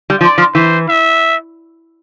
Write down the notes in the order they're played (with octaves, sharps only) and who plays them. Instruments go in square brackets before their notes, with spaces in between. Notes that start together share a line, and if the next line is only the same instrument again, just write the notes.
[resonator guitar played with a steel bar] G3
[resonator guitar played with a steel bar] F3 [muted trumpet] D5
[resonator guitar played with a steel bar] F3
[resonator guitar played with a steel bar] E3 [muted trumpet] C5
[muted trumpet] E5